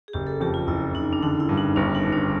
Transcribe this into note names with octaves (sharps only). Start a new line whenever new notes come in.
G#4
F#1 G4
A4
F2 G4
F4
F#1 E4
F#1 D#4
D4
D3 D#4
E4
G2
D#4
G1 D4
D#4
G2
D4